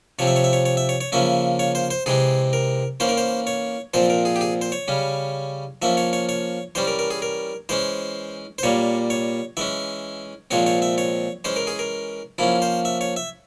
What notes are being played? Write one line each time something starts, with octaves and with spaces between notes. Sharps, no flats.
C3 F3 C4 C#5
E5
C#5
E5
C#5
C#5
E5
C#5
C#5
C#3 F3 A#3 C#4 E5
C#5
C5
C5
C3 E3 G#3 C4 G#4
A#4
E3 A#3 C#4 C5
A#4
C5
C#5
A#2 F3 C4 C5
A#4
G#4
G4
G#4
C5
C#5
C#3 G3 C#4
F3 A#3 C#4 E5
C#5
C#5
C#5
E3 G3 C#4 C5
A#4
A#4
G#4
A#4
E3 G#3 C#4 C5
C5
A#2 G3 A#3 C#5
C#5
E3 G#3 C#4 E5
A#2 F3 G#3 C4 C#5
C#5
E5
C#5
E3 G#3 C#4 C5
A#4
G#4
A#4
F3 A#3 C#4 E4
C5
E5
C#5
E5